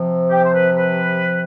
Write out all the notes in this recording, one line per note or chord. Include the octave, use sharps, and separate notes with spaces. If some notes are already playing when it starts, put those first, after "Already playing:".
Already playing: C3 F3
G4
C5
B4
B4